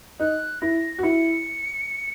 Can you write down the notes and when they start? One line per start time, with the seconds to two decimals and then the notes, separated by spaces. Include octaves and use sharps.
0.20 D#4 F#6
0.61 E4 A#6
0.98 F#4
1.03 E4 C#7